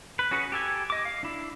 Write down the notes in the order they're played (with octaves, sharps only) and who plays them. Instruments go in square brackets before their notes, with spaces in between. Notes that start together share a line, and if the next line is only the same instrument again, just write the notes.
[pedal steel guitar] B4
C#4 F#4 G#4 B4
G4 A4 G#5
D#5 D6
F5
D4 E4